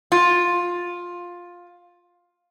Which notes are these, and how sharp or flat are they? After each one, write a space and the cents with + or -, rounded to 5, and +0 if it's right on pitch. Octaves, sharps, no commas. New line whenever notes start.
F4 +10